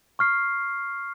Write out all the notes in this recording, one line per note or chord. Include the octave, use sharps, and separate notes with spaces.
C#6 F6 C7